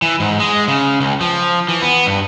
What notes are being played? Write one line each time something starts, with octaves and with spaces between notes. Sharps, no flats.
E3
G#2
G#3
C#3
C#2
F3
E3
B3
G2